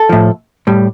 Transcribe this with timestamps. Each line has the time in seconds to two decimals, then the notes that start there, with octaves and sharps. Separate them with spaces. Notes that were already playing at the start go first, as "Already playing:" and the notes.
Already playing: A4
0.09 A2 F3
0.67 A2 G3